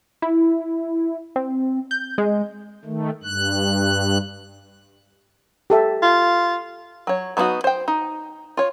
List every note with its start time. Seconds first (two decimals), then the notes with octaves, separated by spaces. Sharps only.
0.22 E4
1.36 C4
1.91 G6
2.18 G#3
2.85 D#3 A3
3.24 G2 F#6
5.70 G4 A4 E5
6.02 F4
7.07 F#3 C#5
7.37 F#3 B3 D4 D#4 F#4
7.64 C5 G5
7.88 D#4
8.57 F4 C#5